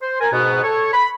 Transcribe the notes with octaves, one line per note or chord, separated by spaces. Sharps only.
C5
A#4 G#5
G#2 B2 B3
A4 C#5
B5